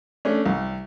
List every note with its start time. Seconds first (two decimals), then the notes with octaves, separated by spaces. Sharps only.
0.25 A3 C#4 D4
0.46 C2